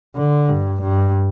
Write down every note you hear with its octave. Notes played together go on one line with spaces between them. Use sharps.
D3
G2
G2